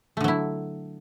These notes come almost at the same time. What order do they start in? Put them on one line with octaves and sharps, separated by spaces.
A3 D3 F#3 E4